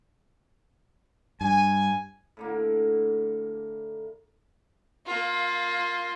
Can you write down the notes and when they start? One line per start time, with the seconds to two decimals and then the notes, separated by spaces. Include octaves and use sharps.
1.41 G2 G#5
2.37 A2 D3 A#3
5.06 A#3 F4